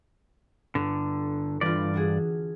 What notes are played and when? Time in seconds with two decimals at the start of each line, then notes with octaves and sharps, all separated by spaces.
0.75 G1 D3
1.61 G2 E3 F4 D5
1.94 D4 F#4 G#4